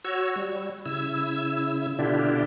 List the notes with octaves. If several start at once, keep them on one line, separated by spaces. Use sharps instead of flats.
F#4 C#5 E6
G3
C#3 E4 E6
B2 D3 D4 E4 F4 G4